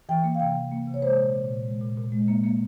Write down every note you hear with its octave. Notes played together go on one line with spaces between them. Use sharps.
E3 G5
A#3
F5
C3 G5
E3
A#3
C3
C#5
G#3 C5
A#2
A#2
A#2
G#3
A#2
A#2
G#3
A#3
A#3